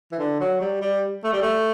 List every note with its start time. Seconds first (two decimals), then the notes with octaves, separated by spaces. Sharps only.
0.12 E3
0.19 D3
0.40 F#3
0.61 G3
0.81 G3
1.24 A3
1.33 G3
1.42 A3